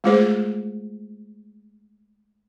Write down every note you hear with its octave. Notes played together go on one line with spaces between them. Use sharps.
G#3 A3 F4 G#4 C5